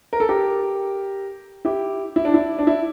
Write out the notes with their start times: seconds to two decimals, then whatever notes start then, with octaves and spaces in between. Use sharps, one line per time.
0.13 A#4
0.20 A4
0.29 G4 A#4
1.65 E4 G4
2.16 E4
2.25 D4
2.34 E4
2.59 D4
2.67 E4